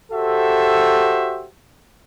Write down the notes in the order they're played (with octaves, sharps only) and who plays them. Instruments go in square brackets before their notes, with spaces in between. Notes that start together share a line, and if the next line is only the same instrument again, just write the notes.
[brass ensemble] F#4 G4 A4 C5 E5